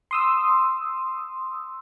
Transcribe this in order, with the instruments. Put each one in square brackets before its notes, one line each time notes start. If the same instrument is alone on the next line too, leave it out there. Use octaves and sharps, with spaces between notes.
[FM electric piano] C6 D#6 E6